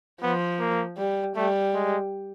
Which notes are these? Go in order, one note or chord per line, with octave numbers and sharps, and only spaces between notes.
F3 B3
A#3
G3
G3 A3
G#3